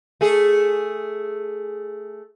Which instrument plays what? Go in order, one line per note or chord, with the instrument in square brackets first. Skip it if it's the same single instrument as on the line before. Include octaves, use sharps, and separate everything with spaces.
[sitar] A3 G#4